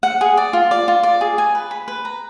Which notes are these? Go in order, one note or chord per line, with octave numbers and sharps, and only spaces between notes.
F#5
G#4
D5
F4
D5
F4
D5
G#4
G#5
B4
B5
B4
A#5